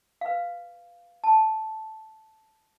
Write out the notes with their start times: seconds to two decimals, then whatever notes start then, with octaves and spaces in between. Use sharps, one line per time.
0.21 B4 F5
1.24 A5